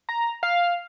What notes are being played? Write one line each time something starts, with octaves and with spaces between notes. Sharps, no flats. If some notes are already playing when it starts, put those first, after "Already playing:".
A#5
F5